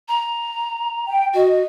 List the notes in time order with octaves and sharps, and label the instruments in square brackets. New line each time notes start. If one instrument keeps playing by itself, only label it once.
[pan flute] A#5
[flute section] G5
[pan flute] F#4 [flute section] D#5